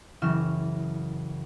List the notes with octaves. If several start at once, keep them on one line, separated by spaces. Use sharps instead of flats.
F#1 C#3 E3 C#4 F6 E7